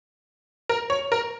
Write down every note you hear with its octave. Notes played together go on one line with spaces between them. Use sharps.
A#4
C#5
A#4